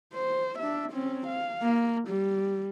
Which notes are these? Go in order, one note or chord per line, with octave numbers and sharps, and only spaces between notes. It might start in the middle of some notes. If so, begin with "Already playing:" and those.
C5
D4 E5
C4 C#4
F5
A#3
G3